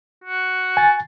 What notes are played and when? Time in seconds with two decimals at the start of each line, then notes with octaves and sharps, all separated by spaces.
0.24 F#4
0.77 G#5 A6